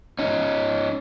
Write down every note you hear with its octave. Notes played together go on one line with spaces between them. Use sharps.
C#4 D#4